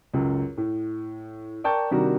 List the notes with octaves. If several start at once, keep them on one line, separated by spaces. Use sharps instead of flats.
C#2 F#2
A2
A#4 D5 G5 A5 C#6 G6
C3 D#3 G3 D4 F#4 A#4